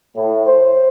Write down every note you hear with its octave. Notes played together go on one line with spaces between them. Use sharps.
A2
C5